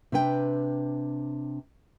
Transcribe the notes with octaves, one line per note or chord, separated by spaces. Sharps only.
C3 D4 B4 G5